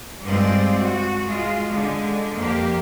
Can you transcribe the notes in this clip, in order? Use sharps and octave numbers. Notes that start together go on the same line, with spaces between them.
G2 G#3 C4 F4 D5
F#4
G#3 F4
D3 G#3
F2 A#3 G4